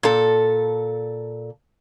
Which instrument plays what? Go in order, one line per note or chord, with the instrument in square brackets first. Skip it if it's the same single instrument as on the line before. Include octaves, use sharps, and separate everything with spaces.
[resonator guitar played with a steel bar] A#2 A4